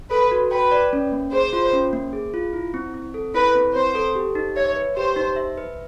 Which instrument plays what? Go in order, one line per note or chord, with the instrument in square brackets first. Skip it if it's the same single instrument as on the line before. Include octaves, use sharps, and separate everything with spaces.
[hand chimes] A4 [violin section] B4
[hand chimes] F#4
[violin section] B4 [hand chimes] G5
[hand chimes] D5
C#4
A#3
[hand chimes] G#4 [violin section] C5
[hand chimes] F4
C#4
A#3
G#4
F4
E4
C4
C4
A4
[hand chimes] E4 [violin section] B4
[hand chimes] C4
[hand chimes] C4 [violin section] C5
[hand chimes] A4
G4
D#4
[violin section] C#5 [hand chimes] E5
[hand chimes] B4
[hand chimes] G4 [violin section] C5
[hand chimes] D#4
E5
B4